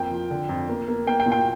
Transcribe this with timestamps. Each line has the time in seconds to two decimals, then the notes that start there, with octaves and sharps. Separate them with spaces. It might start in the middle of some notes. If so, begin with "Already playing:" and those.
Already playing: F2 A#3 G5
0.11 F3
0.30 D3
0.49 F2
0.69 A#3
0.88 A#3
1.07 A#3 G5
1.20 G5
1.26 A#2
1.32 G5